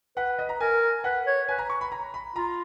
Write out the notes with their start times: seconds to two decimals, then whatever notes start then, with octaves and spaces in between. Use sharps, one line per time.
0.16 B4 F#5
0.39 D#5
0.49 A#5
0.61 A#4 G#5
1.04 B4 F#5
1.26 C#5
1.48 B4 G#5
1.58 A#5
1.70 C#6
1.81 B5
1.92 A#5
2.14 B5
2.36 F4 A#5